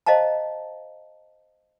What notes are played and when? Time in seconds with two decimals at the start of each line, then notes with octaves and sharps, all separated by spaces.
0.06 C5 D#5 F5 A5 A#5